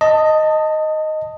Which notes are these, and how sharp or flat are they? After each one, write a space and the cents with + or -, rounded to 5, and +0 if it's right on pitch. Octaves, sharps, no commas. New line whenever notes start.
D#5 +0 A5 +25